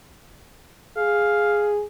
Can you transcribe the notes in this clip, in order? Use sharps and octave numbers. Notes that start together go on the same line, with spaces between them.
G#4 F5